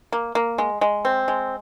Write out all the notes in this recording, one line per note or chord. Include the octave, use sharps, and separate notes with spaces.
A#3
A#3
G#3
G#3
C4
G#3